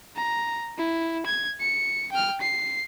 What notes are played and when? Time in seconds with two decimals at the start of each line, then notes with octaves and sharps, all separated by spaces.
0.16 A#5
0.78 E4
1.26 G#6
1.60 C#7
2.12 G5 F6
2.41 C7